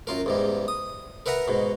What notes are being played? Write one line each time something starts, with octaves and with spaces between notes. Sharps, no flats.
F#2 F4 A#4
E2 G#2 G3
D#6
A#4 B4 E5 F#5 A#5
G#2 B2